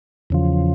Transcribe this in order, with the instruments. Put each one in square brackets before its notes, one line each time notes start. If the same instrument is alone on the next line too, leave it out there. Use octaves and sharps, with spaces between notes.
[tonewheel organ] E2 C#3 F3